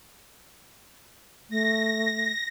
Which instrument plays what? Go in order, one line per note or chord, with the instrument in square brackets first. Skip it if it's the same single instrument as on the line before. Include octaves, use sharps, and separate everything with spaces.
[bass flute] A3 [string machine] A#6